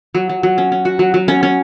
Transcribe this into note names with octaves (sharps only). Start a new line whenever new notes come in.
F#3
F#3
F#3
C#4
C#4
F#4
F#3
F#3
C#4
C#4